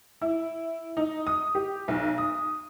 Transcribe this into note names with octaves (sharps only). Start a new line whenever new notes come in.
E4
D#4
D#6
G4
B1
D#6